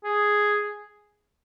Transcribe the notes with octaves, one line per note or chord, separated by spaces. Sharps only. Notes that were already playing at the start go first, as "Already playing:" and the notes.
G#4